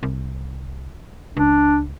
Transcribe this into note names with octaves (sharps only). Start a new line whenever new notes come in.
C2
C#2 D4